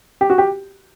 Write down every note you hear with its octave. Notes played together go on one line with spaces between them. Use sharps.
G4
F#4
G4